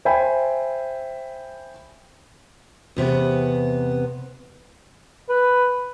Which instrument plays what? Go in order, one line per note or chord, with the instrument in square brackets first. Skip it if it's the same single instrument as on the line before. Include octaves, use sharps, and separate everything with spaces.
[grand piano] C5 E5 G5 G#5 B5
[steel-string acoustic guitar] E2 C3 B3
[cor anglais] B4